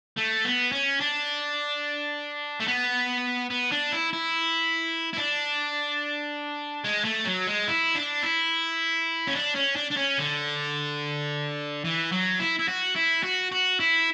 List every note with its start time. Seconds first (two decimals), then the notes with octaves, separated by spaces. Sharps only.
0.17 A3
0.45 B3
0.72 C#4
1.00 D4
2.60 A3
2.68 B3
3.50 B3
3.71 D4
3.92 E4
4.13 E4
5.13 E4
5.17 D4
6.85 G#3
7.05 A3
7.25 F#3
7.47 G#3
7.68 E4
7.95 D4
8.23 E4
9.27 C#4
9.35 D4
9.55 C#4
9.76 D4
9.91 D4
9.97 C#4
10.18 D3
11.85 E3
12.12 F#3
12.40 E4
12.59 E4
12.68 F#4
12.96 E4
13.23 F#4
13.52 F#4
13.80 E4